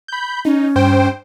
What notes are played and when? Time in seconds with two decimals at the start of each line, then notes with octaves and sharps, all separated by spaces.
0.08 B5 G6
0.45 C#4 D#4
0.76 G2 C5 G5